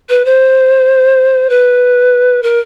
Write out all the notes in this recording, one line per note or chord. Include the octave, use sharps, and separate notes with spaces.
B4
C5
B4
A#4